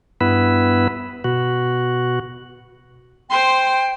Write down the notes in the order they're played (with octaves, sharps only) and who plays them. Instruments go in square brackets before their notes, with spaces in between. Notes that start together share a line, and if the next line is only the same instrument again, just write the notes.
[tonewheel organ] G2 B3 E4 B4
B2 F#4
[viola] C5 C6 [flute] G5